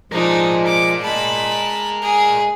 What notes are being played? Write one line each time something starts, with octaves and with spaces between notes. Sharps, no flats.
F3 G#3 D4 D#4 A#4 D5
D6
G#3 A5 B5
G#4